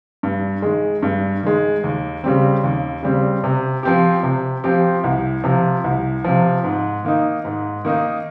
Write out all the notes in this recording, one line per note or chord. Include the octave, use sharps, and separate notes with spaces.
G2
D#3 G#3
G2
D#3 G#3
D#2
C#3 G3 C4
D#2
C#3 G3 C4
C3
F3 C4 G4
C3
F3 C4 G4
C2
C3 F3
C2
C3 F3
G#2
D#3 A#3 D#4
G#2
D#3 A#3 D#4